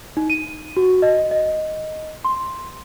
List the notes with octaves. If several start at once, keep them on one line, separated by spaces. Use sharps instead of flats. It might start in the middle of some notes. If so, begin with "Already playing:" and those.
D#4
D#7
F#4
D#5
D#5
C6